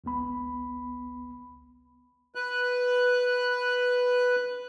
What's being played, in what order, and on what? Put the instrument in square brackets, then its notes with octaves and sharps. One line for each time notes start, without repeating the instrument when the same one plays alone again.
[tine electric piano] G#1 C#2 B3 B5
[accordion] B4 F#6